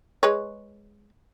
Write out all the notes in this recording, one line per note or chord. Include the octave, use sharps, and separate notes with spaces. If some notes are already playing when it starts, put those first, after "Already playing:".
G#3 B4 C#5